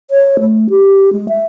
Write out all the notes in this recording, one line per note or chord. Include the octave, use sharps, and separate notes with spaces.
C#5
A3
G4
G#3
E5